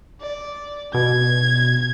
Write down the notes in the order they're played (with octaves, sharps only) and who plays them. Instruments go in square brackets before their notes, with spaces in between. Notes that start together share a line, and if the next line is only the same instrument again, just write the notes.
[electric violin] D5
[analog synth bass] B2 [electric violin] G#6